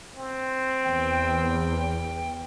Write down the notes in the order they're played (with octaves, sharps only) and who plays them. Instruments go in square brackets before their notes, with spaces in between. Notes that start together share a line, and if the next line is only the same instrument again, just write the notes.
[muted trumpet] C4
[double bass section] E2 [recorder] G5